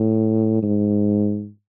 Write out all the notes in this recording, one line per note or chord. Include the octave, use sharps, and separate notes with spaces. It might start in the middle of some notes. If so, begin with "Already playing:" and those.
Already playing: A2
G#2